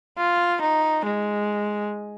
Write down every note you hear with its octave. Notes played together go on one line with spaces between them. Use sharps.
F4
D#4
G#3